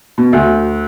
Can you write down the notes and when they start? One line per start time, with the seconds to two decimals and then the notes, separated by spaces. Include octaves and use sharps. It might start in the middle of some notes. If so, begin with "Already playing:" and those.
0.18 B2
0.33 D2